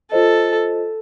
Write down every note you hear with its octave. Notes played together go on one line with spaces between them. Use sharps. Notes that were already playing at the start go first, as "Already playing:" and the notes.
F4 A4 C5 D#5